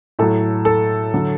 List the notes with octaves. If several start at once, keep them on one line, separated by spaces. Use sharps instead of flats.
A2 F#3 A4
A4
D3 F#3